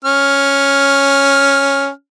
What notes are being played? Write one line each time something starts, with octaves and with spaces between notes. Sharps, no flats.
C#4 F6